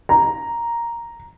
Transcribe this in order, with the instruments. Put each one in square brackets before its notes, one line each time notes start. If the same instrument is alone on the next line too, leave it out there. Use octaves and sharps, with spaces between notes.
[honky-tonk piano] A#5